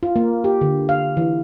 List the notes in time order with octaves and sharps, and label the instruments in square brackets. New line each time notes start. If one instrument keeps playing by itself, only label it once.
[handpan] F4
A#3
G4
D3
F5
E3